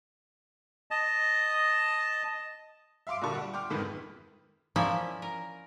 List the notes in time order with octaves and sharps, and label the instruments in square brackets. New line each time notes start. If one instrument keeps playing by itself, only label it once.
[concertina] D#5 A5
[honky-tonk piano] E5 F5 C6 D6 D7
A#2 D3 G3 A5 C#6
G3 F#5
G5 C6 D6 F6
F#1 F2 G#2 D#3 A4 B4
[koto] F3 A#3 C#4 E4 D5 E5
A#4